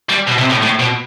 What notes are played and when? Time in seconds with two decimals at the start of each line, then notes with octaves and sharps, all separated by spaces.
0.09 G3
0.27 B2
0.38 C3
0.50 A2
0.62 A2
0.79 B2